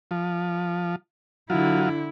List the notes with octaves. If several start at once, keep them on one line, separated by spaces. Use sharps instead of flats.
F3
D3 F#3 E4 F4